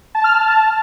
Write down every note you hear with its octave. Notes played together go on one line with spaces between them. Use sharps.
A5
F6
A5